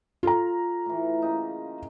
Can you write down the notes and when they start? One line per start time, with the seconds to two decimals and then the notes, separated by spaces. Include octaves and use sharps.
0.23 F4 A4 A#5
0.86 A2 E3
1.22 C#3 A#3 D#4